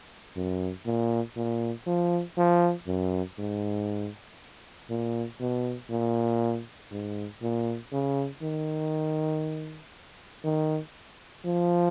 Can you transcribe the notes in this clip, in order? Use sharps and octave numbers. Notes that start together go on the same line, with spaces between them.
F#2
A#2
A#2
F3
F3
F#2
G#2
A#2
B2
A#2
G#2
A#2
C#3
D#3
D#3
F3